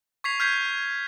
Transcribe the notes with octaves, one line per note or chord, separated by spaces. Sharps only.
C#6 G#6 B6 C7 F7
F6 G6 G#6 B6 C7